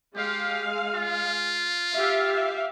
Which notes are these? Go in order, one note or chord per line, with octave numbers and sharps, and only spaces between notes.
G#3 G4 F5
F4
G4 E5 F5